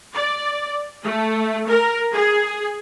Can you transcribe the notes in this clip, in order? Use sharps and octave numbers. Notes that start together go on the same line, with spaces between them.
D5
A3
A#4
G#4